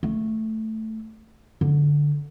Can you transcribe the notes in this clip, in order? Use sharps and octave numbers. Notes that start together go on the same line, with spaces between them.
A3
D3